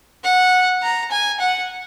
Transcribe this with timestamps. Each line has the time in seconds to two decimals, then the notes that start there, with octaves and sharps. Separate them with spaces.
0.24 F#5
0.83 A#5
1.11 G#5
1.40 F#5